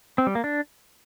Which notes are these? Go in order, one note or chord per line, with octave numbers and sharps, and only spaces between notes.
C4
G3
A#3
D4